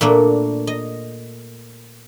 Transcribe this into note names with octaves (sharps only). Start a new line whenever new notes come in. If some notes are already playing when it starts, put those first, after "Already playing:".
A#2 A3 A#3 D4
D#5